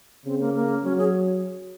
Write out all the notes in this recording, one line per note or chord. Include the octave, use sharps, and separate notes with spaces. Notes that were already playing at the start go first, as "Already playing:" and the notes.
C#3 C4
A#3
A#3
F#3 C#4
G#4